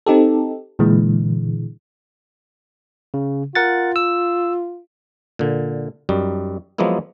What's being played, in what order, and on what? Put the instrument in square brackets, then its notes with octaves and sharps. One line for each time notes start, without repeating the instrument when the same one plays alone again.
[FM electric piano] C4 D#4 G4 A4
A#2 D3 E3 G#3
[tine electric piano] C#3
[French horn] F4 [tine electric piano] A#4 F#5 A6
[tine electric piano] E6
[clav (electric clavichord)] A#2 D3
F#2 G3 D#4
F3 F#3 G#3 A#3 B3 E4